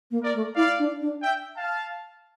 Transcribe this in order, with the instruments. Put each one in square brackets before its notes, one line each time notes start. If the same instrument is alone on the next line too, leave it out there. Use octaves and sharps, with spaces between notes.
[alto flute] A#3
[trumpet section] A#4 D5
[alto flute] A3
[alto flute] E4 [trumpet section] D5 F5
[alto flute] D4
D4
[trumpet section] E5 G5
F5 A5